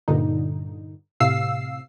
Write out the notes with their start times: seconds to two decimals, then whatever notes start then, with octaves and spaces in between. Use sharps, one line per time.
0.08 G2 A#2 D3 D#4
1.20 A2 C3 F5 E6 C7